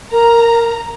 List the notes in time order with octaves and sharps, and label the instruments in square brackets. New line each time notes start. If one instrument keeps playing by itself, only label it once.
[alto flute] A#4 [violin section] A#5